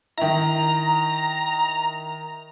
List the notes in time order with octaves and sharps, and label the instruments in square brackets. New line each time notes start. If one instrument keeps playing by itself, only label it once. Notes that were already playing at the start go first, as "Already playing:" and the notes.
[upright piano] D#3 E4 [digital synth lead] A#5